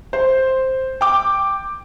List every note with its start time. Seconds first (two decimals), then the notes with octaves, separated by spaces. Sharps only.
0.13 C5
1.01 G5 D6